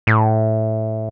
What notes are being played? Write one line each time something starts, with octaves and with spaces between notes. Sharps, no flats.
A2